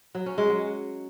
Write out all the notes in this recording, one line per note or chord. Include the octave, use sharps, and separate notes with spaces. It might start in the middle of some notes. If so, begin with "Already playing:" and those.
F#3
C#4
G#3
F#3